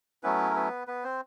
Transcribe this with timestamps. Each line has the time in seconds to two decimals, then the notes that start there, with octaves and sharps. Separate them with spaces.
0.23 F#3 A3 B3 C#4 E4 B4
0.50 A#4
0.55 B3 B4
0.87 B3 B4
1.04 C4 C5